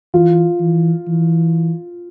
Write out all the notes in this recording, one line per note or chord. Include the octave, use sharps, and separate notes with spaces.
E3 F4
E3
E3